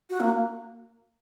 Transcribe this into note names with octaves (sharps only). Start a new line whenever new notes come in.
F#4
A#3